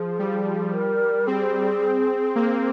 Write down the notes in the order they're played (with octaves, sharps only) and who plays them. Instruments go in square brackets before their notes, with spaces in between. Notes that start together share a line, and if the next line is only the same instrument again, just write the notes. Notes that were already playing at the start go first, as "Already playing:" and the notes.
Already playing: [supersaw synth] F3 [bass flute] G#4
[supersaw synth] G3
[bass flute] A#4
[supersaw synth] C4 [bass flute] G#4
[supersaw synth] A#3